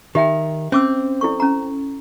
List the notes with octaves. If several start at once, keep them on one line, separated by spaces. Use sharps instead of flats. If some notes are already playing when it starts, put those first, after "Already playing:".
D#3 G4 E5 G5
C4 C#4 D6 E6
E4 A4 C#6
C#4 A#5